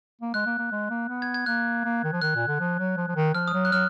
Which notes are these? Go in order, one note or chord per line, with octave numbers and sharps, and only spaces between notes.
A#3
G#3 F#6
A#3
A#3
G#3
A#3
B3
G#6
G#6
A#3 F#6
A#3
D#3
F3
D#3 F#6
A#2
D3
F3
F#3
F3
F3
D#3
F3 F6
D#6
F#3
F#6
F#3 F6